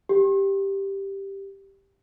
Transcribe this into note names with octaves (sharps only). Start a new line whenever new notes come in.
G4